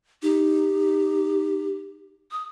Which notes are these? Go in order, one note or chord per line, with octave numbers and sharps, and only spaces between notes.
D#4 G4
D#6